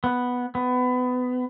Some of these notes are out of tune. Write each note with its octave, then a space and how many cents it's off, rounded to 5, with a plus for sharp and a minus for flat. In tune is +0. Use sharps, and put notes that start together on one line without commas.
B3 +0
B3 +25